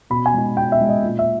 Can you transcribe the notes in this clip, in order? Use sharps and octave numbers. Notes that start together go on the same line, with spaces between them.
B2 B5
G#5
G#3 D#4
B2 G5
E5
G#3 D#4
D#5
A#2
E5